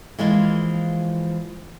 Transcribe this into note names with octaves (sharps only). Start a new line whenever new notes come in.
E3 F3 G#3 A#3 E4 F4